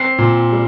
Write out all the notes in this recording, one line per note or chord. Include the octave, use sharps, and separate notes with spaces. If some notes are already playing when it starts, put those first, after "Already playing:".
Already playing: C4 C7
A#2
G3